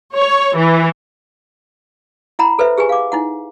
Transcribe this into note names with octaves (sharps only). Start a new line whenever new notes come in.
C#5
E3
E4 F#5 A#5 B5
A4 B4 C5 E5
G4 G#4 B4 G#5
F5 D6
D#4 E4 F#5